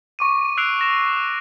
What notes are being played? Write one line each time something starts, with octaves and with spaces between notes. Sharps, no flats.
C#6 D6 D#7
E6 F#6 C7 D7 D#7 F7
A#6 E7
D6 E6